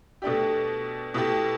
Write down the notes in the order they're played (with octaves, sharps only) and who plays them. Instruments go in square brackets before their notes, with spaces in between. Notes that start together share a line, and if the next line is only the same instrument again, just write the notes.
[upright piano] B2 A3 D4 G4
B2 A3 E4 G4